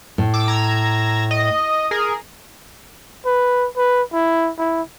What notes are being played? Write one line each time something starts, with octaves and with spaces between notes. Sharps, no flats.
A2
D6 E6
A#5 E6 G#6
D#5
G#4 A#4
B4
B4
E4
E4